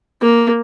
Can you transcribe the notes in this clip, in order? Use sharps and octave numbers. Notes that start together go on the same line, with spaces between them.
A#3